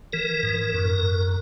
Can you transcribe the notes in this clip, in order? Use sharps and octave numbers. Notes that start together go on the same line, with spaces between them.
E3 A#4
G#2
F#2